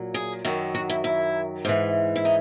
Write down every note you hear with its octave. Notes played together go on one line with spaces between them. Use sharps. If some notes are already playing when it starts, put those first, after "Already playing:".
Already playing: A#2 F#3
G#4
F#2 D#3 F#3
F#4
E4
E4
G#2 E3
E4
D#4